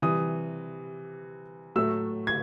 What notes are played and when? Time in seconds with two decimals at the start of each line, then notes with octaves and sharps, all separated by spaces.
0.02 C3 E3 G3 D#6
1.75 A2 F#3 A3 E6
2.27 G#6